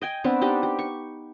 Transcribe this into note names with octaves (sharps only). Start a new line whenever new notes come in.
D#5 G5 G#5
B3 C4 D4 B4
D4 D#4 G4
G4
C#6